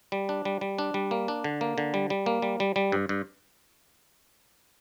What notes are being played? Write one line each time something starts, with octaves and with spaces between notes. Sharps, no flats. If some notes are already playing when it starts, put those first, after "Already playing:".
G3
D4
G3
G3
D4
G3
A#3
D4
D3
A#3
D3
G3
G3
A#3
G3
G3
G3
G2
G2